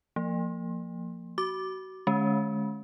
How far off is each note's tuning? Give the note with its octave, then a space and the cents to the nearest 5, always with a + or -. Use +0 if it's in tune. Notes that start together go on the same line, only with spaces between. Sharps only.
F3 +0 A#3 -15
F#4 +30 D6 +5
D3 +30 G#3 +25 C#4 +0